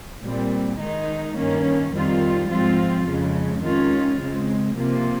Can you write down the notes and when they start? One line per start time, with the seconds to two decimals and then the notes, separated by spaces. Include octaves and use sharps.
0.24 A#2 G3 C4
0.81 D#3 G#3 D#4
1.37 G2 D#3 A#3 C#4
1.94 F2 D#3 G3 C4 F4
2.50 G#2 F3 C4 F4
3.07 F2 C#3 G#3
3.63 D#3 G#3 C#4 F4
4.21 C#3 G#3 C4
4.77 C3 F3 A#3 F4